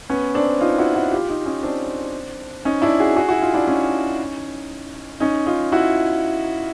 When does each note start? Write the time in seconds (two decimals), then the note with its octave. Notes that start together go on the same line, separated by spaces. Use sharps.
0.09 B3 C#4
0.35 C4 D4
0.61 D#4 F4
0.78 E4 F#4
0.94 E4 F#4
1.11 F4 G4
1.28 D#4 F4
1.46 C#4 D#4
1.63 C4 D4
2.65 C#4 D#4
2.82 D4 E4
3.00 F#4 G#4
3.16 F#4 G#4
3.29 E4 F#4
3.42 D#4 F4
3.54 D4 E4
3.67 C#4 D#4
5.20 C#4 D#4
5.47 D#4 F4
5.72 E4 F#4